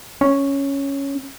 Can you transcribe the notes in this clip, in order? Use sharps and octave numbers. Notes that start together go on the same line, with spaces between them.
C#4